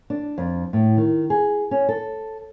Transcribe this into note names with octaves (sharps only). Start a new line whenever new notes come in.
D4
F2
A2
D#3
G#4
C#4
A4